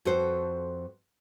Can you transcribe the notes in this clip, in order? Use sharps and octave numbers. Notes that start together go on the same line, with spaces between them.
F2 F#4 A4 C5